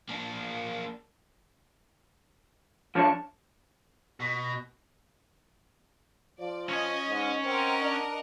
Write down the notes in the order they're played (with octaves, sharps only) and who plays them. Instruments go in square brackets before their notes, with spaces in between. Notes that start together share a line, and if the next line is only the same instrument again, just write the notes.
[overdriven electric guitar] A#3 D4
[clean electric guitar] F3 D4 C#5 [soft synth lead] A5
[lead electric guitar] B2
[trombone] F3 [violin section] D5
[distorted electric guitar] C#4 G#5 [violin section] D#5
[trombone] G#2
[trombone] C4 [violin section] A#4 D#5 F#5
[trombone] D4